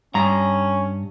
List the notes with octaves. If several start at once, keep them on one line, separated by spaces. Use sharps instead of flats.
G2 C#4 A#5